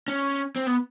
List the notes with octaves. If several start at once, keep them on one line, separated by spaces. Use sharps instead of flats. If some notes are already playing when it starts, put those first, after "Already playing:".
C#4
C4
B3